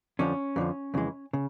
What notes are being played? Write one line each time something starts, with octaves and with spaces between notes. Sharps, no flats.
F2 D3 F3 C#4
F2 D3 F3
F2 C#3 E3 G#3
C#3